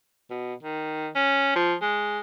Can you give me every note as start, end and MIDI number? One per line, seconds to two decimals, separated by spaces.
0.30 0.54 47
0.63 1.09 51
1.15 1.54 61
1.55 1.75 53
1.82 2.21 56